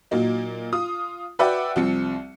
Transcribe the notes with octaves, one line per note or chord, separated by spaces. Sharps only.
A#2 F#3 A#3 D#4
F4 D#6
F#4 B4 D5 E5 F#5 G5
C2 F3 C4 C#7